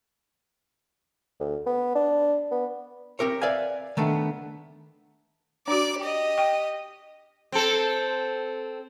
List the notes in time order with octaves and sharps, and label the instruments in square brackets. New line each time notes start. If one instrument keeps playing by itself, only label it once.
[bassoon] D2
B3
D4
B3
[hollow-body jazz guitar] C4 G4 A#4 C#5
B4 D5 E5 F5 G#5
D#3 A3 B3 D4
[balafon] D4 F#4 [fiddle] D5 D6
[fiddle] G4 D#5
[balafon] G5
[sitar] C4 A4